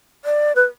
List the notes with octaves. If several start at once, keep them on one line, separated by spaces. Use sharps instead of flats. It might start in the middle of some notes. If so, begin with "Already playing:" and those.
D5
B4